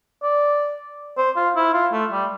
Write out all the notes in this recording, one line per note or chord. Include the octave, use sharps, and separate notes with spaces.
D5
C5
F4
E4
F4
A3
G3